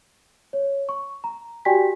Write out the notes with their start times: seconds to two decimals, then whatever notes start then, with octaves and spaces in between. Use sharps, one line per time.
0.53 C#5
0.89 C#6
1.24 A#5
1.65 F#4 G4 D5 G5 G#5 B6